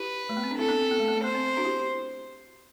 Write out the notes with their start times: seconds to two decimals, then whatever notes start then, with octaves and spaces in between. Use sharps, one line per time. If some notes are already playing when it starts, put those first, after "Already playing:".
Already playing: E4 G4 B4
0.29 A3
0.37 B3
0.44 C4
0.51 D4
0.58 C4 E4 A4
0.69 B3 D4
0.80 C4
0.91 B3
1.00 A3
1.08 B3
1.15 A3
1.24 B3 C5
1.35 C4
1.57 D4 F#4
1.65 E4 G4